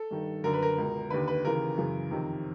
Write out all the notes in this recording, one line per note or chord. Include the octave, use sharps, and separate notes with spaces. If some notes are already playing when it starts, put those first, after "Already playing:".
Already playing: A4
G2 D#3
F#2 D3 A#4
B4
A#4
C#2 B2
D#2 D3 B4
B4
D#2 C#3 E3 A#4
F#2 C#3 E3
F2 C3 D#3